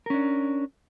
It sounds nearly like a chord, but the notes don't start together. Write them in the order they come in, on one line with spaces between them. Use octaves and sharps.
A#4 C#4 D4